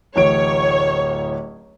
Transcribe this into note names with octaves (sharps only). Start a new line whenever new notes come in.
D1 A1 C#5 D7